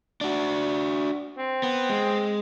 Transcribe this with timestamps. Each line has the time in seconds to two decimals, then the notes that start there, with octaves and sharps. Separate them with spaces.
0.21 D4 F#4
1.38 C4
1.63 B3
1.89 G#3